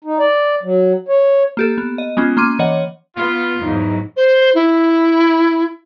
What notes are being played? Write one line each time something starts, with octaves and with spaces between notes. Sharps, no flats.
D#4
D5
F#3
C#5
A#3 G4 A4
B3
D#5
G#3 B3 C#4 F4
A#3 C#4 C6 D6 D#7
E3 C#5 D#5 F#5
B3 F4
E2 G#2 F#3 D#4
C5
E4